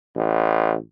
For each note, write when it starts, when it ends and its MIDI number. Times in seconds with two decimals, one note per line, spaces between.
0.16 0.76 33